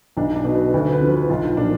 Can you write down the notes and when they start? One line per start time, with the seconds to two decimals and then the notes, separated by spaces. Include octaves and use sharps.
0.17 B1 D4
0.36 D4
0.45 B2
0.55 B4
0.73 D2 B4
0.92 B4
1.01 D3 F3
1.10 B4
1.29 B1 F4
1.57 A#2 F3 D4